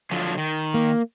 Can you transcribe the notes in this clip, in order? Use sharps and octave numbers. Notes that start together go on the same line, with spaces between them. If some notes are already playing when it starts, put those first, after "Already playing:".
D3 F3 F#3
D#3
A#3